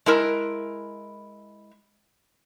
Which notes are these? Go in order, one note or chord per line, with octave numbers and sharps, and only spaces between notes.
G#3 E4 A#4